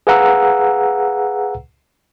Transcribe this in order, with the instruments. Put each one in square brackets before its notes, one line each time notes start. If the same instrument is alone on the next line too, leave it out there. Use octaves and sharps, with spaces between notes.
[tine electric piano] G#4 B4 F5 F#5 A#5 E6